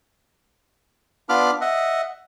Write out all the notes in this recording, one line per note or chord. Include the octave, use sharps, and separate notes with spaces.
B3 D4 F4 B5 D6 F6
D#5 E5 F#5